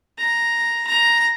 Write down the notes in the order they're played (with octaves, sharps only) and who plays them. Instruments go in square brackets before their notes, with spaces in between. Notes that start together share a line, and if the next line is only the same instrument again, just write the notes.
[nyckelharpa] A#5
A#5